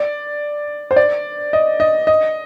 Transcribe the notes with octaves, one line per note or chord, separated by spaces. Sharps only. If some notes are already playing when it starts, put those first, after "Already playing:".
Already playing: D5
C5
D5
D#5
D#5
D#5